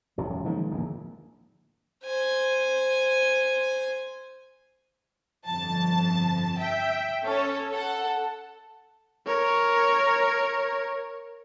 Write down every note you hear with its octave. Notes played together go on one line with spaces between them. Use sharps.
E1 F#2 F#3
D#3 F3 G#3 A#3
D1 A#1 E2
C5 G#5
G1 F2 A5
E5 G5
C#4 A4 C#5
A4 F#5
A#4 C#5